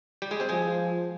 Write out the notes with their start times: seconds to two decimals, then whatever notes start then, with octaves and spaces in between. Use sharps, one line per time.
0.22 G3 G4
0.31 G#3 G#4
0.40 C4 C5
0.49 F3 G#3 G#4